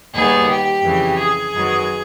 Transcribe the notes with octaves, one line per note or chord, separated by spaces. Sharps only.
D#2 D#3 G3 B3 G#4
G4
F2 C#3 E3
G#4
F#2 D#3 F#3 B3